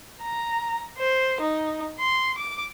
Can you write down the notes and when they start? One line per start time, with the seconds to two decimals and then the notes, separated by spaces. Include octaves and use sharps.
0.22 A#5
0.98 C5
1.40 D#4
1.99 C6
2.38 D6